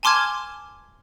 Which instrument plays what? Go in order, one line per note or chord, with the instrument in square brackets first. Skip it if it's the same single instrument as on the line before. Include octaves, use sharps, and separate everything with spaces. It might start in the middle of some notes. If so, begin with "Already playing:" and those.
[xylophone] G#5 A5 C6 D6 F6 G#6